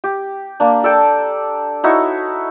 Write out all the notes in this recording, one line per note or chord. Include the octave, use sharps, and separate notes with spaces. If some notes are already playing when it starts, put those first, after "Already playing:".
G4
A#3 D4
A4 D5 G5 A5
D#4 E4 F#4 C#5